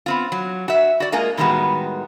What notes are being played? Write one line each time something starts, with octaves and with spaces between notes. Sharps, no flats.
B3 C4 F4
F#3
F#4 E5
F#4 D5
G#3 A#3 F4 A#4 D#5 G#5
A2 D#3 G3 G#3 B3 F#4